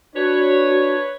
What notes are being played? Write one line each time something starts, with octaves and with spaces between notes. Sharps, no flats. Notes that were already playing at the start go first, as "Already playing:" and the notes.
D4 F#4 B4 C#5